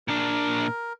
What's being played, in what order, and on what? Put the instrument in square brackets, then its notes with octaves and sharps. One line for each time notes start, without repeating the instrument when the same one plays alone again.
[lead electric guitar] A#2 D4 [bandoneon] A#4